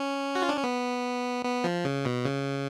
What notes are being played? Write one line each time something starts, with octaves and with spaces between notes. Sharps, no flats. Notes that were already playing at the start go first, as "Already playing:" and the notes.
Already playing: C#4
F#4
F4
D4
C#4
B3
B3
F3
C#3
B2
C#3